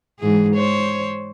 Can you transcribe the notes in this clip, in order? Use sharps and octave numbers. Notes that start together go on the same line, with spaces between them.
G#2 E3 G#4
C5 C#5